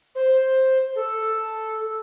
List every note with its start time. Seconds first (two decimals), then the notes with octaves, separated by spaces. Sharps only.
0.15 C5
0.95 A4